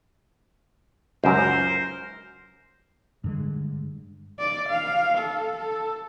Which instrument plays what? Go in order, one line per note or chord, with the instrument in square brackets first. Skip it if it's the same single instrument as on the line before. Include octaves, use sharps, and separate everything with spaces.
[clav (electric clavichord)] C#2 F#2 [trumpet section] A#4 C5
[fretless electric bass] G2 D3 G#3
[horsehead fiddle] D5
F5
A4
A4